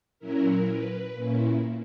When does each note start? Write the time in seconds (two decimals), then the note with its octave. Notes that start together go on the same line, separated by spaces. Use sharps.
0.19 A#2 F#3 C#4 E4 A#4
0.66 B4
1.14 A#2 A#3 C#4 E4